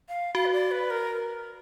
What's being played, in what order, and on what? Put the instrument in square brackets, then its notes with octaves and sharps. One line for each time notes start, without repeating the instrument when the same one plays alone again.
[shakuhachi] F5
[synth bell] F#4 [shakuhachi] F5
[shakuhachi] B4
D5
B4
A#4